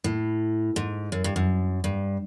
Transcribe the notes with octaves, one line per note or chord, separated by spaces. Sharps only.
A2
G#2
F#2
G2
F#2
G2